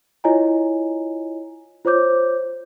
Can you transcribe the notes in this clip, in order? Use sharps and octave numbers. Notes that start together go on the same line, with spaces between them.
E4 F4 C#5 D#5 G#5 A#5
F4 C5 C#5 D6 G6